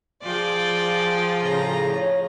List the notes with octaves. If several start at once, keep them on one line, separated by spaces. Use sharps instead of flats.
F3 F4 G#4 D5 G5
A2 C#3 A#5
C#5